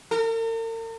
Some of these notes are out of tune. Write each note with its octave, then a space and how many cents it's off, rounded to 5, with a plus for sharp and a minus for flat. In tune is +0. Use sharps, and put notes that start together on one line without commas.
A#4 -45